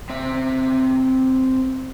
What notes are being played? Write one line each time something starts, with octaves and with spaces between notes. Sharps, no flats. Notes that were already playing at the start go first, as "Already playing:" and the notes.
C4 E5